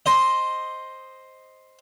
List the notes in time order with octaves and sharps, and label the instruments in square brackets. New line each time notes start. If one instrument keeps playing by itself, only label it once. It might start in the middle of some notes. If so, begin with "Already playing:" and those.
[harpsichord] C5 D#5